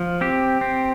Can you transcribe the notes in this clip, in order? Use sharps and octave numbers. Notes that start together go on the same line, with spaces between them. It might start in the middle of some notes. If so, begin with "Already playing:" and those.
Already playing: F3
C4 G4
C4